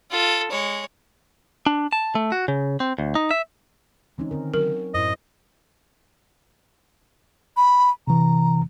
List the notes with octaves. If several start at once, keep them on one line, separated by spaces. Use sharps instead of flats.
F4 A4
G#3 C#5
D4
A5
A3
F#4
C#3
C4
D2
D#4
E5
D3 E3 G#3 C4 C#4 D#4
D3 D#3 C4 A#4
F#3 F#4 A#4
F#2 A2 E4 C5 D#5
B5
C3 E3 A#5